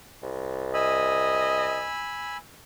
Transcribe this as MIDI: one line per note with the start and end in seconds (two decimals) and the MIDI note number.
0.22 1.88 36
0.74 1.89 75
0.74 2.37 80
0.74 2.37 83
0.74 2.37 88